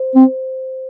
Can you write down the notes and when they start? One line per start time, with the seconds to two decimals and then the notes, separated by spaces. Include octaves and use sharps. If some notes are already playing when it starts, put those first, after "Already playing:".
Already playing: C5
0.15 C4